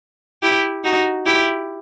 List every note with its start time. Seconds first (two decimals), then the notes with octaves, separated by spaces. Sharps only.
0.42 E4 G4
0.84 D#4 F#4
1.26 E4 G4